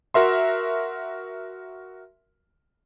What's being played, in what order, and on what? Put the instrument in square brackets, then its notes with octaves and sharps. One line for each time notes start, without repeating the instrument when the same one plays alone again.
[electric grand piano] F#4 A#4 E5 C6